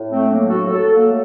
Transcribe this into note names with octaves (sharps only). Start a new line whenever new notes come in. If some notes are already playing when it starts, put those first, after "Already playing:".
Already playing: A2
A3 C4
F#3 A#3 D4
F#4 A4
F#3 F#4 A4
A#3
A3